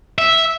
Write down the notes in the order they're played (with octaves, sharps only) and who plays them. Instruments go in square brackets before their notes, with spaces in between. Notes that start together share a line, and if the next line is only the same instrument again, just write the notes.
[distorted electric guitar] E5